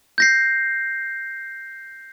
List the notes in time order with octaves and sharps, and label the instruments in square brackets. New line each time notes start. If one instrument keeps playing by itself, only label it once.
[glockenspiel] G6 A#6 C7